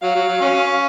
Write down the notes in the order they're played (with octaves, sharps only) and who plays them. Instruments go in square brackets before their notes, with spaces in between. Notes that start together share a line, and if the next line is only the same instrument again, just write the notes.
[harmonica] F#3 [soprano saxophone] F5
[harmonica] F#3
F#3
F#3 C#4